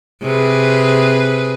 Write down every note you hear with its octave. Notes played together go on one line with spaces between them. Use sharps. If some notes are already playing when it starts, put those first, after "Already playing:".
C3 G#4 B4